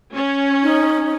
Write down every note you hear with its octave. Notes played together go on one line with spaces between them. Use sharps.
C#4
D#4